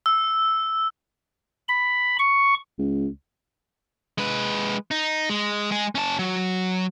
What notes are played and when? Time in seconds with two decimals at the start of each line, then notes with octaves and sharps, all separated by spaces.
0.06 E6
1.68 B5
2.19 C#6
2.79 C#2
4.18 G#3 B4
4.91 D#4
5.30 G#3
5.71 G#3 G#4
5.95 C#4 A5
6.19 F#3